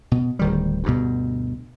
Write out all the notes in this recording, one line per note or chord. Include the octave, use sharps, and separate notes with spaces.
B2
D1 D#3 G3
D2 G2 B2